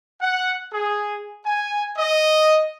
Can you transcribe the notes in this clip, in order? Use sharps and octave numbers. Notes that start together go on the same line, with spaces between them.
F#5
G#4
G#5
D#5